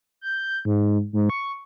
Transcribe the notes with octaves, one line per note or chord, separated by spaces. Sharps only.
G6
G#2
G#2
C#6